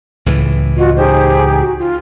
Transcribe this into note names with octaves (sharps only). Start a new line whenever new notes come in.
C#2 A2 E3
F4 F#4 D#5
D#4 G4 G#4 C5
F#4
F4